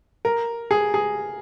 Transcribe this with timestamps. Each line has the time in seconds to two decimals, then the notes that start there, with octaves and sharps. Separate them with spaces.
0.25 A#4
0.71 G#4
0.94 G#4